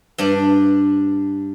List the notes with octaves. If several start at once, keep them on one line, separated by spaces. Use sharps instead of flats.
G2 D4